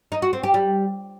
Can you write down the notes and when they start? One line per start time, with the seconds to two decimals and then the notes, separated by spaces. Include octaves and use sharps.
0.12 D#4
0.22 F#4
0.33 C4
0.43 G4
0.54 G3